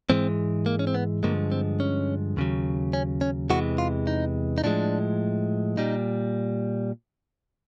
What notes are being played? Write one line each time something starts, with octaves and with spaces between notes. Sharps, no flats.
G#2 E3 G#3 C4
A#3
C#4
C4
B3
G2 D3 F3 G#3 A#3
C4
C#4
D#2 C#3 F#3
C#4
C#4
E2 C3 E3 G#3 F#4
F4
D#4
D#4
A2 F3 G#3 D4
A#2 G3 D#4